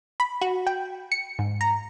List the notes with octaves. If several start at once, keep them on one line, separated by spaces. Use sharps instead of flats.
B5
F#4
G5
C#7
G#2
A#5